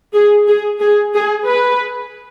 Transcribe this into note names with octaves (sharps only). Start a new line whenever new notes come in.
G#4
G#4
G#4
G#4
B4